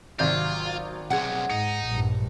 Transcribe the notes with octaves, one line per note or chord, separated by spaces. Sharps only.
G#1 C3 F#3 F4 D5 G6
B1 C3 G#4 F#5
G#2 D#4 C#7
A#1 G2